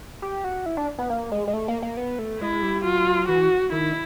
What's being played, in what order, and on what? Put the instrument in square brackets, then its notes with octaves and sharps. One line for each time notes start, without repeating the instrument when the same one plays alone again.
[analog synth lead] G4
F#4
E4
D4
B3
A#3
G#3
G#3
A3
A#3
A#3
B3
A3
[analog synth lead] G#3 [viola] E4
[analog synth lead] G3
[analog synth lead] F#3 [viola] F4
[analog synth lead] E3 [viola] F#4
[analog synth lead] D#3 [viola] E4